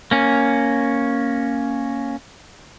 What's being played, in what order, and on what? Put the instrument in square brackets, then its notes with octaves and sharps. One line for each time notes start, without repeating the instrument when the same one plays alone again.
[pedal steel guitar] A#3 C#4